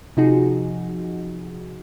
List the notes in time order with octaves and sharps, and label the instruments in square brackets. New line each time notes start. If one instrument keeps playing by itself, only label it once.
[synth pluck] C3 F3 D#4 F#4 G#4